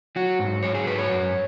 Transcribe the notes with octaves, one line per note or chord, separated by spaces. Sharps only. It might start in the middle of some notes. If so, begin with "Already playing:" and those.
F#3 F#4
G#2
F#3 C#5
G#4
G#2 B4
C#5
F#2